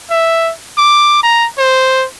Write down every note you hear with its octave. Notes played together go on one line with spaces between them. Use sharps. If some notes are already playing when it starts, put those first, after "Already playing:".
E5
D6
A#5
C5